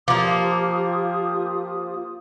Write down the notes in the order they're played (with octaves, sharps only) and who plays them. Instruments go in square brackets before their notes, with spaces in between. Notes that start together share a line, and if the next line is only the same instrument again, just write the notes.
[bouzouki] F3 A#3 [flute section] F4 G4 D#6 [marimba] D6